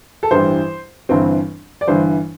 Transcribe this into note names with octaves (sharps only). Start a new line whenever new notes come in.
A4
A1 G2 E3 G3 C5
G1 G2 E3 C4
D5
G1 G2 E3 C5